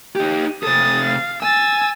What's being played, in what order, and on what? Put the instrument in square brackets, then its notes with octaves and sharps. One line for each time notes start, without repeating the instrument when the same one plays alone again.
[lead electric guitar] D#4 G4
[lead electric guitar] C3 A4 [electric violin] D#6 A6
[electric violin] F5
[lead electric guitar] G#5 [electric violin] E6 A6